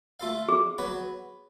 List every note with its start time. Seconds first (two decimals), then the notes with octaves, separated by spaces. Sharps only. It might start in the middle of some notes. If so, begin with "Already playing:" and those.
0.20 A3 F4 A4 F5
0.49 G#4
0.78 F#3 B3 F#4 B4